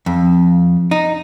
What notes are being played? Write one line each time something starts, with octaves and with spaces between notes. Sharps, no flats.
F2
D#4